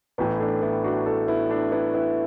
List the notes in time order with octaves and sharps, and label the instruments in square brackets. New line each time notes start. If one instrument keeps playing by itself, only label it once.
[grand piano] A1 A2 E3 B3
A3 D4
B3 E4
D4 F#4
E4 A4
B3 E4
A3 D4
B3 E4
B3 E4